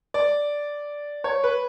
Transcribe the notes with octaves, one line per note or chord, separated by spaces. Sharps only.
D5
C#5
B4